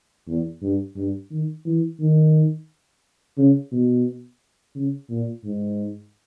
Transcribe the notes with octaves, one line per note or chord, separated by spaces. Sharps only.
E2
G2
G2
D#3
E3
D#3
C#3
B2
C#3
A#2
G#2